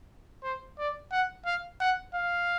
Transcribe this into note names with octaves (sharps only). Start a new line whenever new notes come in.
C5
D5
F#5
F5
F#5
F5